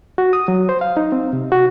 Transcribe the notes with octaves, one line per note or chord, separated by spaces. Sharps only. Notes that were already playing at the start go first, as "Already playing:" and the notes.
F#4
D#6
F#3
C5
F5
D#4
C4
C3
F#4